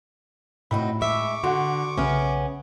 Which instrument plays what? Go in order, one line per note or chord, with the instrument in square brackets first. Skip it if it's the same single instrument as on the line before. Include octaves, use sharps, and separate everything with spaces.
[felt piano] A2 [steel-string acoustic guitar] C4 D#4 F#4 [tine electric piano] B5
[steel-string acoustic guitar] G#3 E5 [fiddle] C#6 D6
[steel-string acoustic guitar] D3 [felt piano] F#4 F#5 [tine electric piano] C6
[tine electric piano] B1 C#3 [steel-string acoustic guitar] B3 C#4 [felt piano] E5 F6